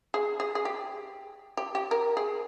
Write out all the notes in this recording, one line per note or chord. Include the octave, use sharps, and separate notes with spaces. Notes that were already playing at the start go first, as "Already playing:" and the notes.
G#4
G#4
G#4
G4
G4
G4
A#4
G#4